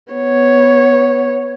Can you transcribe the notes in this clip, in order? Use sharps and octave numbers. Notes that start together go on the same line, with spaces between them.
B3 C#5